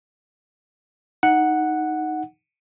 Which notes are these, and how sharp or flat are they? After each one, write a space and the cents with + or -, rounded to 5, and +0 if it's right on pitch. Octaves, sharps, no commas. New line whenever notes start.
D#4 +0 F#5 +0